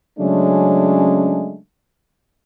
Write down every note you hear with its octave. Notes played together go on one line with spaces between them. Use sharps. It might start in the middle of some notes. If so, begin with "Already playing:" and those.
C#3 F#3 G#3 A3 C#4 D4